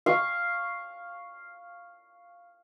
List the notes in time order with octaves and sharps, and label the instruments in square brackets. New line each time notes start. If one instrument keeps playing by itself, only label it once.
[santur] F5 C#6